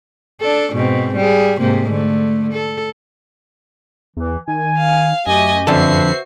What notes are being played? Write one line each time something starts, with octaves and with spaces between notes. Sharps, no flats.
D4 A4
G#2 B2 C4
G3 G#4
G#2 C3 A#3
D3 A3
A4
E2 E3
D#3 G#5
F5
F#2 A3 G4 D#5 G#5
F2 D3 F#4 A4 B4 C5 E5 C7